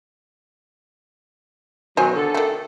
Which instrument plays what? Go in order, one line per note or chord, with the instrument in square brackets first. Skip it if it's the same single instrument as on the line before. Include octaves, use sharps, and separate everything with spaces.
[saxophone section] B2 D#3 F#3 [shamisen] C5 D#5 G#5
[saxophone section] D3 A4
[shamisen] D#3 A3